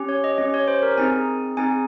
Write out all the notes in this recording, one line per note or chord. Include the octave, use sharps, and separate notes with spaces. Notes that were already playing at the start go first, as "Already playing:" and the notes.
Already playing: C#4 G4
C#5
D#5
C#4 G4 D#5
C#5
C5
A#4
C4 D#4 G#4 G#5
C4 D#4 G#4 G#5